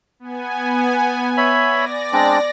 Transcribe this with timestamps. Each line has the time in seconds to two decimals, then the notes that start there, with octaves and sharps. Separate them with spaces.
0.20 B3 G#5
1.37 C#5 E5 B5
1.68 D5 A#6
2.13 G#3 C4 D4